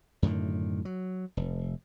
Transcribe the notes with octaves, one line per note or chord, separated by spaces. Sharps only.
F#2 A2 D3 D#3
F#3
F1